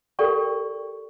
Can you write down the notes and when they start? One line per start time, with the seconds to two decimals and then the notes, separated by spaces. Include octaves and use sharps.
0.19 G4 A4 A#4 D5 G5 C#6